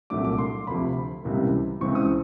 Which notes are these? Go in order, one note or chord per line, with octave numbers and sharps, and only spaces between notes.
C2 A#2 F#3 A3 D4 D6
D6
C6
D2 C3 F3 B5
C#2 C3 E3 G3 A#3
C#2 C#3 E3 G#3 C4 C#6
D#6